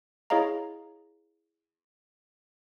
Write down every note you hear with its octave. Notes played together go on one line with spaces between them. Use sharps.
E4 G#4 C#5 D#5 F5 A#5